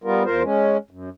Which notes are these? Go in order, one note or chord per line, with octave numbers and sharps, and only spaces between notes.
G3 B3 F4 A#4
E2 F4 A#4 C5
G#3 C#4
F#2